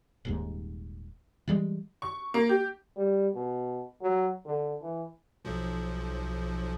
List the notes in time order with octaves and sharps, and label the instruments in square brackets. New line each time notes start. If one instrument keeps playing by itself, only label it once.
[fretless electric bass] D#1 D#2 G#2
E3 G3 G#3
[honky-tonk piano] C#6
A#3
G4
[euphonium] G3
B2
F#3
D3
E3
[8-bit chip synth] B1 F3